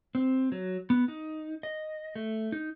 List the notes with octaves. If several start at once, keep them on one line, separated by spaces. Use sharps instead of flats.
C4
F#3
B3
D#4
D#5
A3
D#4